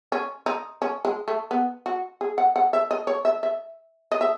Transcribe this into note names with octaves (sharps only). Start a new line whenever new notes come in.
C#4
D#4
C#4
G#3
A3
B3
F#4
G#4
F#5
F#5
E5
D#5
C#5
E5
E5
D#5
E5